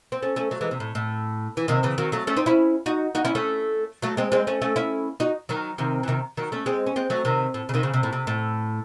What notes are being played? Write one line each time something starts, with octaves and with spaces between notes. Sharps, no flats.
C4
A3 C#4
A3 C#4
F#3 A3
E3 G#3
C3
A2
A2
E3
C3 D#3
C#3 E3
D#3 F#3
F#3 A3
A3 C#4
C4 D#4
C#4 E4
D#4 F#4
D#4 F#4
C#4 E4
A3 C#4
F#3 A3
G#3 C4
G#3 C4
A3 C#4
A3 C#4
C#4 E4
D#4 F#4
D#3 F#3
C3 D#3
E3
C3 D#3
D#3 F#3
A3 C#4
G#3 C4
C#4
G#3 C4
F#3 A3
C3 D#3
A2
C#3
C3 D#3
C#3
C3
A2
C3
A2